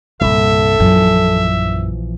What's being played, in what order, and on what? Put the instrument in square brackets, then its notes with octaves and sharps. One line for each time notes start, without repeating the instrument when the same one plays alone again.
[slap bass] C2 [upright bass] G2 A#2 [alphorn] A4 [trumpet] E5
[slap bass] A#1 E3 F3 [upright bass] F#2